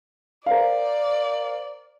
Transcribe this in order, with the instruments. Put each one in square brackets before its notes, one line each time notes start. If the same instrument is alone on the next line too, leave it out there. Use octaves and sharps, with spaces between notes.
[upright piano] A#4 C5 F5 [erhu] D5